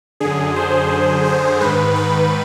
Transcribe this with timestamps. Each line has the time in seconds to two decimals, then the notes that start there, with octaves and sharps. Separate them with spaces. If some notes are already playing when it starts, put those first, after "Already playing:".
0.20 F#2 D3 G#4
0.56 C5
1.25 C5
1.61 G#2 D#3 B4
1.96 B4